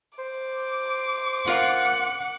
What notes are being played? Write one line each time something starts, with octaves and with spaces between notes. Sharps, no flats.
C5 D6
F4 A#4 F5 F#5